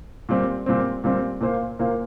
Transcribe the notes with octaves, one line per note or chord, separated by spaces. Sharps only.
A#2 G3 C4
A#2 G3 C4
A#2 G3 C4
A#2 A#3 F4 C5
A#2 A#3 F4 C5